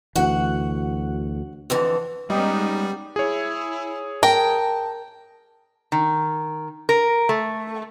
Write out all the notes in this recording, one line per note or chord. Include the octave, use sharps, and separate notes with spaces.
D2 E3 F#4 F#5
F2 D3 E3
G3 G#3 B3 C#4 D#4 G4
E4 G#4 C#5
A#4 G5 A5
D#3
A#4
A3